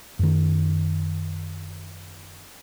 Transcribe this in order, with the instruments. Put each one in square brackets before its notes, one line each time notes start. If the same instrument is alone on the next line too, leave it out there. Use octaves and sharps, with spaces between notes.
[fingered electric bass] F#2 D#3